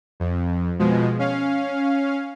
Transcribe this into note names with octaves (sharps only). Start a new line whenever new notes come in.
F2
B2 F3 G#3
C#4 F5